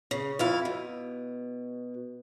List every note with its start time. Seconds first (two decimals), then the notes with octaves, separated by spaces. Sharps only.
0.11 C#3
0.39 F2 E4 F5
0.65 B2